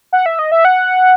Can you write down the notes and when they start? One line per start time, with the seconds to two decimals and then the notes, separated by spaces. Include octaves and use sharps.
0.13 F#5
0.26 E5
0.39 D#5
0.52 E5
0.65 F#5